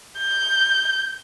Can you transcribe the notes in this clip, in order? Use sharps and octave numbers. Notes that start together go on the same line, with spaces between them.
G6